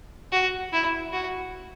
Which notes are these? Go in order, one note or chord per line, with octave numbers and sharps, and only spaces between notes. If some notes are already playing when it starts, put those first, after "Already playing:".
F#4
E4
F#4